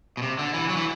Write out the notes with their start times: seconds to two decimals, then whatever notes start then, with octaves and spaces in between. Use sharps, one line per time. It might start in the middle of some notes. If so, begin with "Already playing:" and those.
0.17 B2
0.22 C3
0.39 D3
0.54 E3
0.69 F#3
0.77 E3